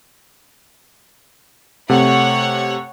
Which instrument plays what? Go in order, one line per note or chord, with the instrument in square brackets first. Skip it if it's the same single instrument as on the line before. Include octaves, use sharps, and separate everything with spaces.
[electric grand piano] C3 A3 [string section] C#5 F#5